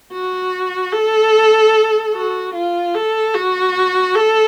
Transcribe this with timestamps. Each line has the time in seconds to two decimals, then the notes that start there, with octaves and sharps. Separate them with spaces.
0.13 F#4
0.93 A4
2.14 F#4
2.54 F4
2.95 A4
3.35 F#4
4.16 A4